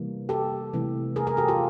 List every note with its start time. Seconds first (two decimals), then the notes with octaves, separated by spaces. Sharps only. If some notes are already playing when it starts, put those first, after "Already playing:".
Already playing: C3 E3 G3 A#3
0.29 G4 A4
0.73 C3 E3 A3
1.16 G#4 A#4
1.27 G#4 A#4
1.37 G4 A4
1.48 F4 G4